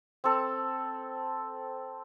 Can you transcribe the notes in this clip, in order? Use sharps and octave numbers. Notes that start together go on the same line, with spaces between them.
C4 A4